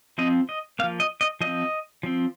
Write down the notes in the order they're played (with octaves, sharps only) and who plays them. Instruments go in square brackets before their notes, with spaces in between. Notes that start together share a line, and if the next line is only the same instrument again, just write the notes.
[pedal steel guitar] F3 C4 D#5
D#5
A#3 F5
F3
D#5
D#5
F3 C4 D#5
F3 C4